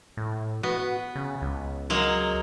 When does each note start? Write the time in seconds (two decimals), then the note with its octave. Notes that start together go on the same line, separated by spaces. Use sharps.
0.17 A2
0.63 B3 F#4
1.15 C#3
1.42 C#2
1.90 F#3 G#3 A#3